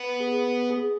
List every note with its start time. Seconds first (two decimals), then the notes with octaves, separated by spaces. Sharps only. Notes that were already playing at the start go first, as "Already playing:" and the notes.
Already playing: B3
0.20 G#4
0.70 G#4